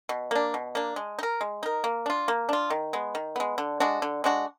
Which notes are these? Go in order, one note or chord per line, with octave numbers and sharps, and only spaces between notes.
B2
A#3 D4
B2
A#3 D4
G#3
D#4
A#4
G#3
D#4 A#4
A#3
D4 F4
A#3
D4 F4
D#3
G#3 B3
D#3
G#3 B3
D3
G#3 D4 F#4
D3
G#3 D4 F#4